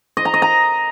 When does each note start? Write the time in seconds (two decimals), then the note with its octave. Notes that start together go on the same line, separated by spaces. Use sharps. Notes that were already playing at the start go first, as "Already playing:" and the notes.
0.17 D#5
0.25 A#5
0.34 D#5
0.42 A#5